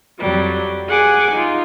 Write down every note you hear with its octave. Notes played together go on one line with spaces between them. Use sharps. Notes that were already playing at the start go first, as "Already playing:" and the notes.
F2 F#3 G3
G#4 F#5 G#5 D6
D#4 F4